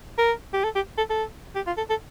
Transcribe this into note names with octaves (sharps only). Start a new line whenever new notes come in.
A#4
G4
A4
G4
A4
A4
G4
F4
A4
A4